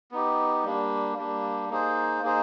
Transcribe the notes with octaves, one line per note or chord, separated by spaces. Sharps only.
B3 D#4 G4
G3 A#3 D4
G3 A#3 D4
A#3 D#4 G#4 C5
A#3 D#4 G#4 C5